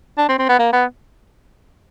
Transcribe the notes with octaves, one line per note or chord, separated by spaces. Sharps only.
D4
C4
C4
B3
A#3
B3